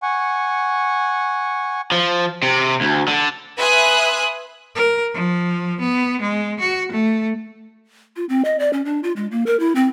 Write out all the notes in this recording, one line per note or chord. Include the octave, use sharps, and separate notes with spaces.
F#5 G#5 C#6
F3
C3
D2
D3
B4 E5 G#5 C6 D#6 F#6
A#4
F3
B3
G#3
F#4
A3
F4
C4
D#5
D5
C#4
D4
F4
G#3
A#3
A#4
E4
C4